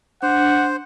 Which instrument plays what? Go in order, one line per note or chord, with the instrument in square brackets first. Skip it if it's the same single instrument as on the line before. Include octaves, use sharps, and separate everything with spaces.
[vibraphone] D4 [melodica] C5 [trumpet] F#5